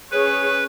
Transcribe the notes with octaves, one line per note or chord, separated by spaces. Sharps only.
C#4 G#4 B4 C#5